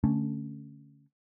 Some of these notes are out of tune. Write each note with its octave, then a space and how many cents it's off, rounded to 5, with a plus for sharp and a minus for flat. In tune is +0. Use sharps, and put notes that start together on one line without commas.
D3 -15 A3 +0 C#4 +0